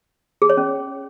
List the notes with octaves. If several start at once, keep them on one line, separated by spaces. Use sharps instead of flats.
G#4
C#5
C#4